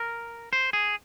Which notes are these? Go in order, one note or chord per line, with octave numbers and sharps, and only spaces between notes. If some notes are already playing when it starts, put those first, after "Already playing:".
Already playing: A#4
C5
G#4